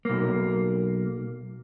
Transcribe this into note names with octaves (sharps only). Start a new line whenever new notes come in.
B1 A#3